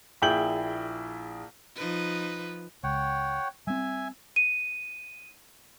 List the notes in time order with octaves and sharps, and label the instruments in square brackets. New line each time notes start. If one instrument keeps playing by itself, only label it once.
[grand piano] A#1 E4 G#4 G5 G6 F#7
[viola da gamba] F3 D#4 B4
[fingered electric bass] C#2 [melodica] C#5 F#5 G5
[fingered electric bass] G3 C4 [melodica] E5 G#5
[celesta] D#7